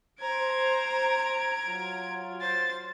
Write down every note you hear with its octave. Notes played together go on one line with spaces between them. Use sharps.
C5 A#5 G#6 D7
F#3 F4
C5 A6